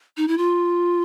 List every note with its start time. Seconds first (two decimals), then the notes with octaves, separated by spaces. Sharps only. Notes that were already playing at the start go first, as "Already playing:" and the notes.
0.17 D#4
0.28 E4
0.38 F4